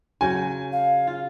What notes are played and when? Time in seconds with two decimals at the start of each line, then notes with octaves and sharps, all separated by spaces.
0.21 C#3 F#3 G5 G#5
0.72 F5
1.07 F4